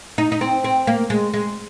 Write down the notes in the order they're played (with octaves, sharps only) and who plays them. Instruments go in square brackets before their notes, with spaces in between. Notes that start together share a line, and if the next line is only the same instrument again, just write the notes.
[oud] D#4
D#4
C4
C4
A#3
G#3
G#3